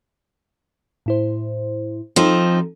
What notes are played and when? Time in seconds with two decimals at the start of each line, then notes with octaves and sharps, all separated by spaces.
1.06 A2 E4 C5
2.16 F3 C4 D#4 A4